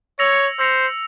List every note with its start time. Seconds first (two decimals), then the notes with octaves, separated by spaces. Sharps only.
0.19 C#5 E6 A#6 C#7 F7
0.59 C5 E6 A#6 C#7 F7